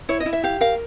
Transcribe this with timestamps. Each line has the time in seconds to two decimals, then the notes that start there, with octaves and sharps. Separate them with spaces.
0.09 E4 C#5
0.20 D#5
0.26 E4
0.33 E5
0.43 G4 F5
0.61 A#4 F5